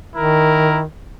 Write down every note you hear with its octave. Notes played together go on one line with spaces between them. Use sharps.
D#3 E4 A#4